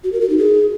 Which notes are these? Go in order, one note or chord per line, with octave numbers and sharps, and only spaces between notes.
F#4
A#4
F#4
D#4
G#4